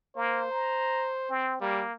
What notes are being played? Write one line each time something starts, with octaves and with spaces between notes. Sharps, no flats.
A#3 C5
A#5
C4
G3 A#3